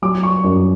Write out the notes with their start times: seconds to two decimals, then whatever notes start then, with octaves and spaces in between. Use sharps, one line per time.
0.02 F#3 D6
0.23 C#6
0.44 F#2